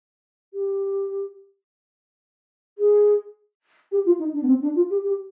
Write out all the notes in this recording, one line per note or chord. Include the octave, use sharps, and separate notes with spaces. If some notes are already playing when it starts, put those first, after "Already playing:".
G4
G#4
G4
F4
D#4
D4
B3
C4
D4
F4
G4
G4